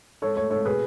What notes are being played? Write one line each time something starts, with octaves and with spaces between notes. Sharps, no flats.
G#2 A4 C#5
A3 A4 C#5
G#2 A4 C#5
B2 G#4 B4